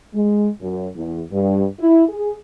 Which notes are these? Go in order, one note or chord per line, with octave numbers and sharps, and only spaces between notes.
G#3
F#2
E2
G2
E4
G#4